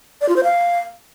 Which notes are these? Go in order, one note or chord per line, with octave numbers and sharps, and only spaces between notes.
D5
F4
C5
F5